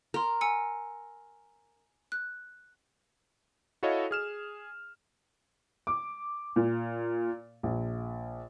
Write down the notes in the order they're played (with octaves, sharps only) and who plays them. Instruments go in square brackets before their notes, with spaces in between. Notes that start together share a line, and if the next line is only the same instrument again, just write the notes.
[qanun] A#4 [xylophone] A#5 C6
[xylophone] G#5 E6 C#7
F#6
[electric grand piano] E4 F#4 A4 C#5 D#5 F5
G#4 F6 E7
[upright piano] D6
A#2
A#1